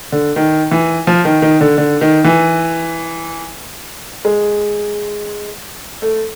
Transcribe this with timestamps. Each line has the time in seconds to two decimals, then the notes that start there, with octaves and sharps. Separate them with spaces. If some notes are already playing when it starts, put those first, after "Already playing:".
0.12 D3
0.36 D#3
0.71 E3
1.07 F3
1.25 D#3
1.42 D#3
1.61 D3
1.78 D3
2.01 D#3
2.24 E3
4.25 G#3
6.02 A3